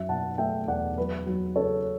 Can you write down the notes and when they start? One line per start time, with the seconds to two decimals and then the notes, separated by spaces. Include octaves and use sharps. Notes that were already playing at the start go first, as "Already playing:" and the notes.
Already playing: F#2 F#3 E5
0.09 B2 F#5 A5
0.38 A3 E5 G5
0.68 E2 D5 F#5
0.98 F#3 B4
1.27 F#3
1.56 C#3 A4 C#5